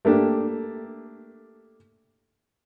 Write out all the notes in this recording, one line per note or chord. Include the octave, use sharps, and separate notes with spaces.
A3 A#3 D4 G4